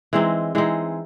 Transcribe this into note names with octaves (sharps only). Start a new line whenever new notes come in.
E3 G#3 C4 D#4
E3 G#3 C4 D#4